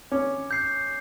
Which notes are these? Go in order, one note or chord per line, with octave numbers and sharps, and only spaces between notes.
C#4 D6
G6 C7